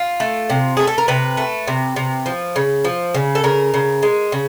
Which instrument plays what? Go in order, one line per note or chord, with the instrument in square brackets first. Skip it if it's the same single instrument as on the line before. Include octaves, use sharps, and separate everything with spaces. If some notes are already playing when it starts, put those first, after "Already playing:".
Already playing: [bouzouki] F4
A3
C3
A3 G#4
A4
A#4
C3 B4
A3
C3
C3
F3
C#3
F3
C#3
A4
C#3 A#4
C#3
G#3
C#3